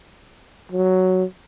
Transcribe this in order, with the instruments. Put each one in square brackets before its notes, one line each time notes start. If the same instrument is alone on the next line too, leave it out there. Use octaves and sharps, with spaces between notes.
[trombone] F#3